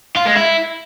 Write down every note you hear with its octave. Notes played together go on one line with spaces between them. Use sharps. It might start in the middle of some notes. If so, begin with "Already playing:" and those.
F4
G#3
E4